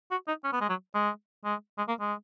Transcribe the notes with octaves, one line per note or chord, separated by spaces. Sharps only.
F#4
D#4
C#4
B3
G#3
F#3
G#3
G#3
G#3
A#3
G#3